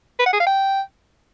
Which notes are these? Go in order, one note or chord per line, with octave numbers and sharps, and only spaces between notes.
B4
F#5
G#4
F5
G5